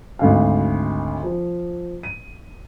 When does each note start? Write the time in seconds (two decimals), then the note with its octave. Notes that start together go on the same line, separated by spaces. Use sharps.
0.19 G#1 D2 F5
1.23 F3
2.03 D#7